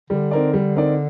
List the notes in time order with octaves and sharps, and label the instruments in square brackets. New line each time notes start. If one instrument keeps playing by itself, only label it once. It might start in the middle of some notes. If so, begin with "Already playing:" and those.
[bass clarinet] D3 [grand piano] G3
[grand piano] C4 D#4 A#4 D5
G3
C4 D#4 A#4 D5